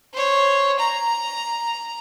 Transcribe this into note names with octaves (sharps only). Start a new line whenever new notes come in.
C5 C#5
A#5